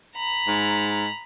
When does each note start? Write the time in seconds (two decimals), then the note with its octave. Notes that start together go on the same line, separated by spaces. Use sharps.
0.16 A#5 B5
0.48 G#2